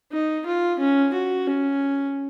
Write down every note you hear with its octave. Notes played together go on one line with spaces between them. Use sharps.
D#4
F4
C#4
F#4
C#4